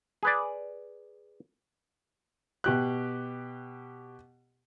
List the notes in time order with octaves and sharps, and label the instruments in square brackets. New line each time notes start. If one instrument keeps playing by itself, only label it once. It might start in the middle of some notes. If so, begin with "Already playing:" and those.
[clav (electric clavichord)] G#4 B4 D5
[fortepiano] B2 G4 F#6